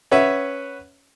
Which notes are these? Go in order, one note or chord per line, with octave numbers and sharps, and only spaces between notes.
C#4 B4 C#5 E5 F#5